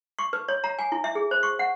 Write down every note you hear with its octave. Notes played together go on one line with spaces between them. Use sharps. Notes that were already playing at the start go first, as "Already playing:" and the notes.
C#6
B4
C#5
A#5
G#5
E4
E5
G#4
C5
C#6
F#5